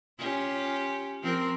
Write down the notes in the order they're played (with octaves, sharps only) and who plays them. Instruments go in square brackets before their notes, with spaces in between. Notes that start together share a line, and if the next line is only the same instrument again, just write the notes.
[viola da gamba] C#4 F4 G4
F3 C4 A#4